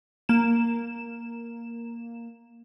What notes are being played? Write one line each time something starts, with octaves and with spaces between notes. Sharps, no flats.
A#3 E7